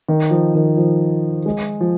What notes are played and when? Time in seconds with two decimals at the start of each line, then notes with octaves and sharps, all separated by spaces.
0.08 D#3
0.31 F3
0.55 D#3
0.77 F3
1.46 G#3
1.81 F3